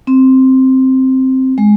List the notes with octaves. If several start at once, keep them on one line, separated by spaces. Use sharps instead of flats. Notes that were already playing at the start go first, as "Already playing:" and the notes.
C4
G#3